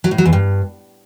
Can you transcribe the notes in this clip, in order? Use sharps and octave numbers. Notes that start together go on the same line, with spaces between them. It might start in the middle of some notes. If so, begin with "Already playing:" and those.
F#3
A2
F#3
E2
G2